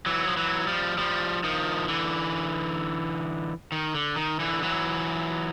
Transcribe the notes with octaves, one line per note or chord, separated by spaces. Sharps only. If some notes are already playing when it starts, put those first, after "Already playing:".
E3 F#3
F3
E3 F#3
F3 G3
F3 G3
D#3 F3
D3 E3
D#3
D3
D#3
D3 E3
E3 F#3